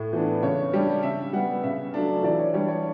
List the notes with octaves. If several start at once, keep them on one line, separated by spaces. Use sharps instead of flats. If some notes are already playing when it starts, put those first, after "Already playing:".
Already playing: A2
E3 B3 D4
C#3 C#5
G3 D4
C#3 E5
G3 B3 F#5
C#3 E5
F#3 A3 D4
E3 D5
C#5
G3 D4 C#5
C#5